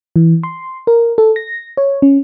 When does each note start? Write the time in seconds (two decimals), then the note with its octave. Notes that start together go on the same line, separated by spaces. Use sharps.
0.16 E3
0.43 C6
0.87 A#4
1.18 A4
1.36 A#6
1.77 C#5
2.02 C#4